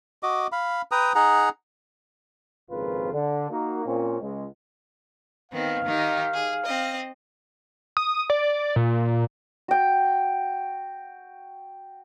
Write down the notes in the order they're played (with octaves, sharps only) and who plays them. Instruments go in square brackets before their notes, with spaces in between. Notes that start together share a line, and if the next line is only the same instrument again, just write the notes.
[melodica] F#4 D#5 D6
F5 B5
B4 G5 A#5 D#6
D#4 G#4 F#5 A#5
[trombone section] G#1 F2 A#2 C#3 F4 B4
D3
A#3 D#4 F#4
A#2 C4 C#4
C#2 G#3
[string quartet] D#3 B3 C4 [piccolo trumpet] F5
[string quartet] D#3 D#4 G4
G#4
C4 D#5
[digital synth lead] D#6
D5
A#2
[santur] F#4 G5